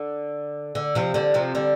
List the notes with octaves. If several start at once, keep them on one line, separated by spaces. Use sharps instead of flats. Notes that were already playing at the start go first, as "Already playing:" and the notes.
Already playing: D3
D3
C3 F3
D3 G3
C3 F3
D3 G3